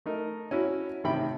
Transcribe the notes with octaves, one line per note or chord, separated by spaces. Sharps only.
A3 D#4 A#4
C#4 E4 F#4
A1 C3 D#3 G5 B5